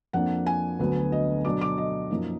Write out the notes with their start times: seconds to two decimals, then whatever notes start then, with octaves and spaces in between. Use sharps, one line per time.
0.13 F2 F3 A#3 D4 F#5
0.46 G#5
0.79 D2 D3 F#3 B3
1.12 D#5
1.45 B2 F#3 D4 D6
1.61 D6
1.78 D#5
2.11 F#2 F3 A#3 D#4